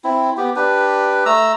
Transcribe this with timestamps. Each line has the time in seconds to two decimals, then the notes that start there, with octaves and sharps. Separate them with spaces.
0.04 C4 E4
0.37 B3 G4
0.56 D4 G4 B4
1.26 A3 A#5 E6